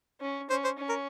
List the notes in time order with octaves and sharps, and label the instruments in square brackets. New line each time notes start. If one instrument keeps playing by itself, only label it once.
[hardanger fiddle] C#4
[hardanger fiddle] C#4 [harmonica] C5
[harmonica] C5
[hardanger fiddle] C#4
[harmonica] A#4